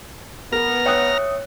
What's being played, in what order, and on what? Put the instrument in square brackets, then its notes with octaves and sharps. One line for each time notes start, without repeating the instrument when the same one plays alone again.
[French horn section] B3 [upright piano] A#4 [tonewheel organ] A#5 F6 A#6
[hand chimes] C#5 E5 C#7 [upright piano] G5 D#6 F#6